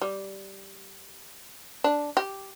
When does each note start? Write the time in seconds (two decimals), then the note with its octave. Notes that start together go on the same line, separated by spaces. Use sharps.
0.01 G3
1.84 D4
2.17 G4